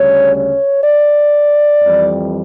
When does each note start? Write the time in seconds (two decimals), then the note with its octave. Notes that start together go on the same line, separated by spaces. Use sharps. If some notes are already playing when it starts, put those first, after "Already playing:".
Already playing: D2 C#3 G3 C#4 C#5
0.34 C#5
0.84 D5
1.82 F2 E3 G3